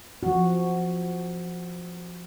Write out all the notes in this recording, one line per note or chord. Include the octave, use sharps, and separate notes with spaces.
F3 F#4